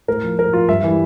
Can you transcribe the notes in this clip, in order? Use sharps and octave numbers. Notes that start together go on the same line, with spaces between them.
A2 A#4
F3
A2 A#4
F3 F4
G2 E5
E3 G3